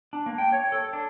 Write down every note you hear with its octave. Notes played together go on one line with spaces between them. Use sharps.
D4
A#3
G5
C#5
A4
D4